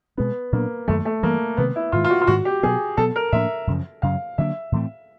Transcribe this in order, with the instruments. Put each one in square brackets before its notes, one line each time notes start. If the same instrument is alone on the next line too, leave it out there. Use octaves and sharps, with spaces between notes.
[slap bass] B2 G#3 C4 [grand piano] B3
[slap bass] A#2 F#3 B3 D4 [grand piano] A#3
[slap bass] F#2 D#3 F#3 [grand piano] A3
[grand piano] A3
[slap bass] G2 E3 G3 [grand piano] A#3
[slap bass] C3 D#3 G#3 C4 [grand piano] B3
[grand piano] E4
[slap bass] G#2 D#3 G#3 [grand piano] F4
[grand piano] F4
F#4
F4
[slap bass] G#2 D#3 G#3 [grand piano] F#4
[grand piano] G4
[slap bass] B2 F#3 B3 [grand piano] G#4
[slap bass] B2 F#3 B3 [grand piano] A4
[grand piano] A#4
[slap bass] A2 F3 A#3 D4 [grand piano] E5
[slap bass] F#2 C#3 F3
[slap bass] F#2 C#3 F#3 [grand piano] F5
[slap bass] D3 F#3 A#3 D4 [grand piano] E5
[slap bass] A2 E3 A3 C4